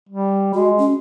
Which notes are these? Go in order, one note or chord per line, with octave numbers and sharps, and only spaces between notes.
G3
G#3 F#4
C#4